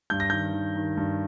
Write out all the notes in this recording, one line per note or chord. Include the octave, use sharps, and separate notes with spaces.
G2 G6
A#6
D#3 G6
D#3
D#3
G2